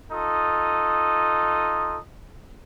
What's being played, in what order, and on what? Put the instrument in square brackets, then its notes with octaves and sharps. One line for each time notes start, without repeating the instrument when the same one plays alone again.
[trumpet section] D#4 F4 A4 D#6